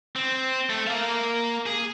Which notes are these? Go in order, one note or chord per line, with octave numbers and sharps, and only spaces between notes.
C4
A3
A#3 F5
G#4